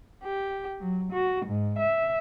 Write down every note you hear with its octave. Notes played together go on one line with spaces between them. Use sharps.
G4
F#3
F#4
G#2
E5